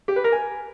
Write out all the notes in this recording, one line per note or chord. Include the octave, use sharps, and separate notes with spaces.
G4
B4
A#4
G#5